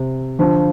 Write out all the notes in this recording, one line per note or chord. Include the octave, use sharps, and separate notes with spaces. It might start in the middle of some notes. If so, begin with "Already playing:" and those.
Already playing: C3
D3 F3